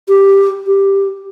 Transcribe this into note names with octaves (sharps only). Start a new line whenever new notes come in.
G4
G4